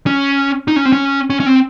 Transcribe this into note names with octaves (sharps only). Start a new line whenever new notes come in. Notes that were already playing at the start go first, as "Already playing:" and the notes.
C#4
D#4
C#4
C4
C#4
C#4
C#4
C4